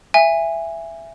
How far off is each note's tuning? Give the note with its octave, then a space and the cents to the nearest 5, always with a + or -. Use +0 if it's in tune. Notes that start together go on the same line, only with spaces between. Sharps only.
E5 +15 G#5 -20